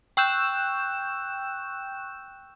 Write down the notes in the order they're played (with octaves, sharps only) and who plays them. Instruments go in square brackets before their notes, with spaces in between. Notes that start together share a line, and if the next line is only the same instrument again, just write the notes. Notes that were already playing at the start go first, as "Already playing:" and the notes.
[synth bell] G5 C#6 E6 F#6 G6 E7